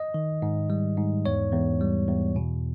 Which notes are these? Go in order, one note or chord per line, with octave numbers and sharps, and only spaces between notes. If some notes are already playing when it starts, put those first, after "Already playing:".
Already playing: D#5
D#3
G#2
G3
G#2
E2 C#5
E2
G3
E2
B2